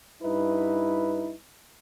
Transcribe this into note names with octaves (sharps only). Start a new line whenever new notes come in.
G2 D#4 E4 B4